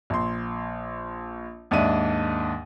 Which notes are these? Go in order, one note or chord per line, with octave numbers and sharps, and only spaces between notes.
A#1 C6
D#2 G#2 D4 D5 E5 D#7